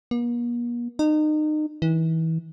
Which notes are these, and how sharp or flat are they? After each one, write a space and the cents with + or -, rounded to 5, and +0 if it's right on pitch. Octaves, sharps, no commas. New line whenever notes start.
A#3 +45
D#4 -30
E3 -30